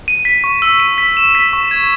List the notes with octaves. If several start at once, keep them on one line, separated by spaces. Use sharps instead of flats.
D#7
B6
C#6
E6
D#7
B6
E7
B6
C#6
G#6